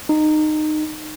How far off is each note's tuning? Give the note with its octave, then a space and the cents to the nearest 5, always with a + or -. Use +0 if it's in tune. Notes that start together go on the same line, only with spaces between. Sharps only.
D#4 -20